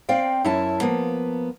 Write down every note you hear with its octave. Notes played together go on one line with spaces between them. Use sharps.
C4 D5 F5 G5
F#2 C#4 E4 E5 A5
F3 A#3 B3